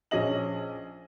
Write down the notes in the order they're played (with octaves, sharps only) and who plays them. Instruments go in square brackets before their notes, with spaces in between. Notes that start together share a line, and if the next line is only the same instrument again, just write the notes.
[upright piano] A#1 C#4 G#4 D#5 F#7